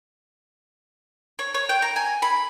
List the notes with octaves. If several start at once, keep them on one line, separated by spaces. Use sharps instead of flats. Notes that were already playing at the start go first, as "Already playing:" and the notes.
C#5
C#5
G5
A#5
G#5
B5